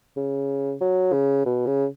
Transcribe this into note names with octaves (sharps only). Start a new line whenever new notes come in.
C#3
F#3
C#3
B2
C#3